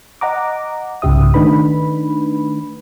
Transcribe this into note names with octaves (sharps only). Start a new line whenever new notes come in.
D#5 F#5 A#5 D6
C2 G#2 C#3 G4 E5 D#6
D#3 A3 D4 D#4 B4 B5